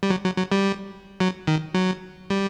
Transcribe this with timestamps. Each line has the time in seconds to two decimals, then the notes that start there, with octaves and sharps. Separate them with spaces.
0.03 G3
0.10 F#3
0.24 F#3
0.37 F#3
0.52 G3
1.20 F#3
1.47 D#3
1.74 F#3
2.30 G3